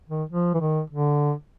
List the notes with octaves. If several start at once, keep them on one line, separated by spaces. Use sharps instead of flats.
D#3
F3
E3
D#3
D3